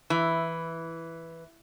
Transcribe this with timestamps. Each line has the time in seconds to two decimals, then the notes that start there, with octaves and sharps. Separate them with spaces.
0.10 E3